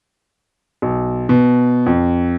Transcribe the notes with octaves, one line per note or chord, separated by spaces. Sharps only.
B1
B2
F2